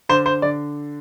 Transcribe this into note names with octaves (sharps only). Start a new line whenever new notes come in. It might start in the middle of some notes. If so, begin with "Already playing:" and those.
D3 C5
C5
D3 D5